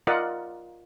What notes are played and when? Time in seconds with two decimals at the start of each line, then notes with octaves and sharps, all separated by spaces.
0.07 F4 A#4 D5 D#5 F#5